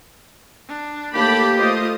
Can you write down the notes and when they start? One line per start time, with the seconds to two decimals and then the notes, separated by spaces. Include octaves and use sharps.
0.68 D4
1.14 D#2 A3 A#3 G4 A5 B5 D6
1.58 A3 F4 C5 D#5 D#6